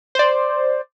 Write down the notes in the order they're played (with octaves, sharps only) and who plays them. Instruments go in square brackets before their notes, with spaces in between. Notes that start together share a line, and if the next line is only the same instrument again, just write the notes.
[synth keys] C5 D5